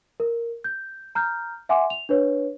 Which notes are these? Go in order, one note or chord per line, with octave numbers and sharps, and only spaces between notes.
A#4
G6
A#5 F6 G6
E5 F#5 G#5 C6 D6
F7
D4 B4 C#5